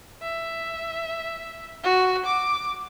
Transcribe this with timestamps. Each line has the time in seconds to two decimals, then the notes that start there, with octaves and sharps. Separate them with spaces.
0.22 E5
1.83 F#4
2.26 D6